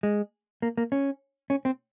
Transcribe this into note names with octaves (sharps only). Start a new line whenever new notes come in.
G#3
A#3
A#3
C#4
C#4
C4